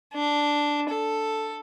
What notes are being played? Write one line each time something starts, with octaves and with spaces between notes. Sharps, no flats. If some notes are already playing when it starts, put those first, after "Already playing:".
D4
A4